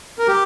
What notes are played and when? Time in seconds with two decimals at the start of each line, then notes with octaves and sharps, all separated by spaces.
0.19 A#4
0.28 G4